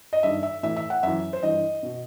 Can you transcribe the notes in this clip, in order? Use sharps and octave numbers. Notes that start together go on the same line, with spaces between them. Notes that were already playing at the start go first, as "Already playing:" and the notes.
D#5
G2 D#3 E5
E5
A2 E3 E5
E5
F#5
F#2 E3 E5
C5
G2 E3 D#5
B2